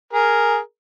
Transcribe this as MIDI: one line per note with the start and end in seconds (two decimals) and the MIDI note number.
0.13 0.58 68
0.13 0.58 70